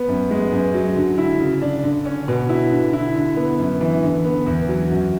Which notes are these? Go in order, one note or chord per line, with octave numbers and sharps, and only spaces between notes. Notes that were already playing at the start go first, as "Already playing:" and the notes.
Already playing: B3
F#2
G#3
F#2
F#3
D3
E4
C#3
D4
D3
C#4
B2
E4
D3
E4
D3
B3
F#2
E3
D3
B3
E2
F#3
F#2